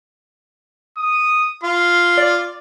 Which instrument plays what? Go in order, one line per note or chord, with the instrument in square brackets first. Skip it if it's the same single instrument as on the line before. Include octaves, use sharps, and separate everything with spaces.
[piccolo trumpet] D#6
[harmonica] F4 [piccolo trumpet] C6
[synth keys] D5